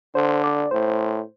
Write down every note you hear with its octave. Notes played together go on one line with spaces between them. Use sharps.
D3 C5
D5
A2 C5